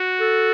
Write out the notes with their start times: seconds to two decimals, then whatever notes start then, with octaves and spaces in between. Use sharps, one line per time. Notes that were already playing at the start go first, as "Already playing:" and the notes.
Already playing: F#4
0.20 A4